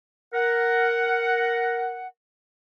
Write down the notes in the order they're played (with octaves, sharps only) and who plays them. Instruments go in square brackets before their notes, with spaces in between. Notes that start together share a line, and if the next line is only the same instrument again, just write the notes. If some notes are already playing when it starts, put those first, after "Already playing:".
[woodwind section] A#4 F#5